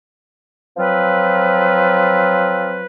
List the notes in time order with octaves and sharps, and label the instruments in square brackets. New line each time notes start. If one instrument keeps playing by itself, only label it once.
[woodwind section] F3 F#3 C4 F4 B4